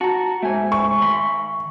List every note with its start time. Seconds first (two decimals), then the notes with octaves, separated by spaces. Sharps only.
0.01 F#4 A5 A#5
0.43 G#2 A3 E5 G#5
0.72 C#6
1.02 D#3 B5 C6